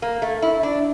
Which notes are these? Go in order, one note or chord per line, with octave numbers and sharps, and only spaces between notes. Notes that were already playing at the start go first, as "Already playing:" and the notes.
A#3
A3
E4
D4